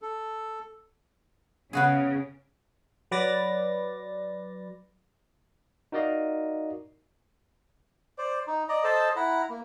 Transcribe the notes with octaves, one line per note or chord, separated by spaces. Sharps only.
A4
C#3 B3 F#4 G#4
F#3 B4 D5 A6 A#6
D#4 F#4 A#4 D5 D#5 F5
C5 D5
D#4
D5 D#5 A#5
A4 C5 D#5 A5
E4 F#5 A#5 B5
A#3